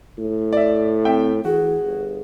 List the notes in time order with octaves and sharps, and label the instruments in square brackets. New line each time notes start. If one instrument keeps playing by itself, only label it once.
[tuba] A2
[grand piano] D5 E5
[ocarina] C4 [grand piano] E5 G5
[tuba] E3 [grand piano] F#4 [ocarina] G#4
[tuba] G1